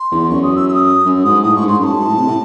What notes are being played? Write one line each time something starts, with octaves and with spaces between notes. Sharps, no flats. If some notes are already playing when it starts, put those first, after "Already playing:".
Already playing: C6
E2
F#2 C#6
D#6
E6
E6
D#6
F#2
G#2 D#6
A2 D#6
G#2 C#6
G#2 C6
F#2 A5 C6
G#2
A2
C3
A2